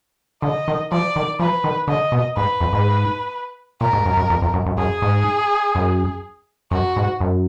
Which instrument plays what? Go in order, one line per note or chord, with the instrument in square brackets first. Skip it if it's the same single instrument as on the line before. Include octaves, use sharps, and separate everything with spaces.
[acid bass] D3 [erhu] D#5
[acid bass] D#3
[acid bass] F3 [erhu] D5
[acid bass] D#3
[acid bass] F3 [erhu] B4
[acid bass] D#3
[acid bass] D3 [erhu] D#5
[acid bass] B2
[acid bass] G#2 [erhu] B4
[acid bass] F2
G#2
[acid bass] A#2 [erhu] A#4
[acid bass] G#2
F#2
F#2
F2
F2
F#2
F#2
[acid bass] F#2 [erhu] G#4
[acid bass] G#2
F#2
[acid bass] F#2 [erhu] F#4
[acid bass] G#2
F#2